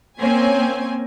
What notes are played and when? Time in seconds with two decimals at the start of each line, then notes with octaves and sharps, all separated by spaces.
0.20 A#3 C4 C#4 G#5